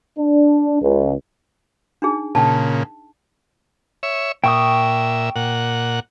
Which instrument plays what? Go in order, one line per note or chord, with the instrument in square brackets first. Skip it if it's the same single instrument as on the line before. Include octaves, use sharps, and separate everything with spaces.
[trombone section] D4
C#2
[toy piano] D4 D#4 G#4
[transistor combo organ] A#2 C#3 [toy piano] G5 A5
[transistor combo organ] C#5 E5
[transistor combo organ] A#2 E5 [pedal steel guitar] G5 C#6 D#6
[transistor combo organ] A#2 F#5